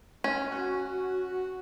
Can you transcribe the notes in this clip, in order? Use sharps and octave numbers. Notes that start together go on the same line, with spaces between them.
C#4
F#4